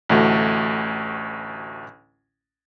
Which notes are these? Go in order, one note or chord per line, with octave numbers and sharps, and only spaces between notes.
A1 D2 A3 F#4